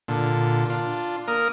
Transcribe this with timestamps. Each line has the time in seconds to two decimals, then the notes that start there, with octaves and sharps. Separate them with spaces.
0.08 A#2 D3
0.70 D4 F4
1.28 A#3 A#4 D#6